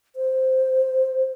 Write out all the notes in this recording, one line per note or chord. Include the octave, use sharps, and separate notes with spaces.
C5